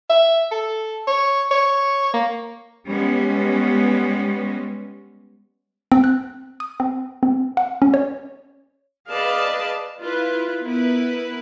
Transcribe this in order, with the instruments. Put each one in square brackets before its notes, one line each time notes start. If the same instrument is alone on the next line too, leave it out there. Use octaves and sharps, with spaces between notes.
[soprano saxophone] E5
A4
C#5
C#5
A#3
[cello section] G3 G#3 B3 C#4
[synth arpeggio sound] C4
F#6
D#6
C4
C4
F#5
C#4
C#5
[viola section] G#4 B4 D5 D#5 F5 A5
E4 F4 B4
B3 E4 A#4 B4